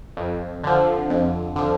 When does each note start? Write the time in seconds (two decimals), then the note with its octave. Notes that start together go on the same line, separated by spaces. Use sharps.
0.17 F2
0.64 D3 F3
1.10 F2
1.56 D3 F3